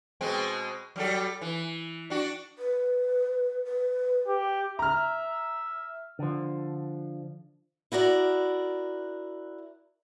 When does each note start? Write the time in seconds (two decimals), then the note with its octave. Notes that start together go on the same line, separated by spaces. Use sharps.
0.21 B2 G#3 C4
0.96 F#3 G3 A4
1.41 E3
2.10 D4 F#4
2.58 B4
3.65 B4
4.27 G4
4.79 E5 A#5 F6
6.19 D3 F3
7.92 E4 F#4 A#4 D5